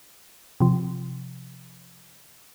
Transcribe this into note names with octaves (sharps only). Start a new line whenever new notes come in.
C3 F3